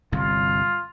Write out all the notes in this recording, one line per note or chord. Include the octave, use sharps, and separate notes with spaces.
G1 C2 G2 F4